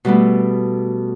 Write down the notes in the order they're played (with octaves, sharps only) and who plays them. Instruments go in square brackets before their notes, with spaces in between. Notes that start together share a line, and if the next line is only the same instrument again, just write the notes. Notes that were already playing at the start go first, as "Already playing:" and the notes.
[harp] B2 G3 A3 B3